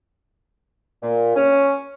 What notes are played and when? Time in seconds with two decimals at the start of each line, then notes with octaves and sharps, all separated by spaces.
1.02 A#2
1.36 C#4